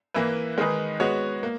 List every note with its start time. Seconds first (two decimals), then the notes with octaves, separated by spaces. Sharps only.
0.14 E3 A#3 E4 B4
0.57 D#3 G#3 D#4 G#4 B4
1.00 G#3 B3 F#4 C#5
1.43 A#3